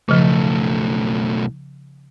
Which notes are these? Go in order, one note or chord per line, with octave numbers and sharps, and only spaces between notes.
B1 C#3 F3 A3